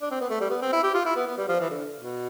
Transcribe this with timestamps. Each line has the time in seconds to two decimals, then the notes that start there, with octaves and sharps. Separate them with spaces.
0.02 D4
0.11 C4
0.21 B3
0.30 A3
0.40 G3
0.50 B3
0.62 C4
0.73 E4
0.83 G4
0.94 F4
1.05 E4
1.16 B3
1.27 B3
1.37 G3
1.48 F3
1.60 E3
1.70 D3
1.99 B2